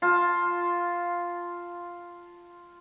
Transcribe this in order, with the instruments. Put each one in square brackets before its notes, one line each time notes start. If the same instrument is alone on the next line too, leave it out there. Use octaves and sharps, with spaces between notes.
[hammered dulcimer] F4 A5